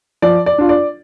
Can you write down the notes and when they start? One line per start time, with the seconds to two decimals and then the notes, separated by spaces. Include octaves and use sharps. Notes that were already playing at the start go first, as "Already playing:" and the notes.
0.22 F3 D5
0.46 D5
0.58 D4 F4
0.69 D5